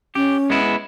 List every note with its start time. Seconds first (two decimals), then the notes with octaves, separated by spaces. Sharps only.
0.15 C#4 G4
0.50 G#3 B3 E4